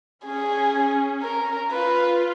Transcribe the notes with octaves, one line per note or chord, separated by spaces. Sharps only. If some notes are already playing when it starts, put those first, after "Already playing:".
C#4 G#4
A#4
F4 B4